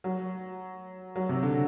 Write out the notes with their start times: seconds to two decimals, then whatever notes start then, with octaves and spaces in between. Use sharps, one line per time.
0.04 F#3
1.16 F#3
1.29 C3
1.43 D3